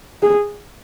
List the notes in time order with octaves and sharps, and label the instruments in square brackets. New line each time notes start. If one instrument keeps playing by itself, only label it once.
[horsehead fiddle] G#4